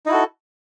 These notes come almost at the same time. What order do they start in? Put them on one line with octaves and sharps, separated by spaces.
D#4 E4 F#4 A4